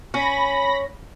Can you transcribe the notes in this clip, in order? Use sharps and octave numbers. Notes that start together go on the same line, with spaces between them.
C#4 B5 A#6